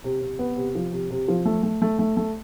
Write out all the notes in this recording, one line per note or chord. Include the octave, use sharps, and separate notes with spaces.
C3
C3
B3
C3
F3
C3
C3
F3
A3
A3
A3
A3
A3